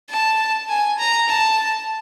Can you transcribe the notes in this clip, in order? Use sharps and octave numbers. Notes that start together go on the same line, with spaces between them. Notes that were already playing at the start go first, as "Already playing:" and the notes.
A5
G#5
A#5
A5